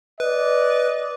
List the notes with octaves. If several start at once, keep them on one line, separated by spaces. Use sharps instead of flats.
B4 D5 D#5